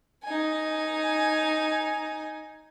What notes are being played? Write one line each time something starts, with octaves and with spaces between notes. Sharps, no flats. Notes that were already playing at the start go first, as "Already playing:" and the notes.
D#4 G#5